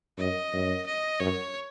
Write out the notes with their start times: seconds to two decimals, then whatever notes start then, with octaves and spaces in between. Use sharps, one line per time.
0.18 F#2 D#5
0.53 F#2
0.86 D#5
1.20 F#2 C#5